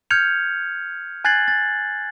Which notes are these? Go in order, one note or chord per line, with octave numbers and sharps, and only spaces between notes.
F6 G6 G#6 C#7 F7
G#5 F#6 G#6 A6 C7 F#7
A6